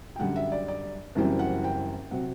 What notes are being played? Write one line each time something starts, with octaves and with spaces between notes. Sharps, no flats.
G5
F#2 D3 G3 F#5
E5
D5
D5
F#1 F#2 E3 G3 C4
F#5
G5
C3 F#3 C4 F#5